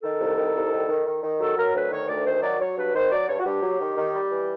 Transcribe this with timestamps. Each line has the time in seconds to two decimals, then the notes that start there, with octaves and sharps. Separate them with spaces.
0.03 D#3 A4
0.21 C2
0.37 D#3
0.55 C2
0.72 D#3
0.89 D#3
1.06 D#3
1.23 D#3
1.40 F#3 A4
1.58 F#3 A#4
1.75 D2 B4
1.91 D#3 C#5
2.09 D2 D5
2.26 D#3 C5
2.43 F#3 D5
2.60 F#3 C#5
2.77 G2 B4
2.94 D#3 C5
3.12 F#3 D5
3.29 G2 C#5
3.40 F#4
3.46 G2 G4
3.63 F#3
3.81 D#3
3.97 D#3
4.14 G3
4.32 E3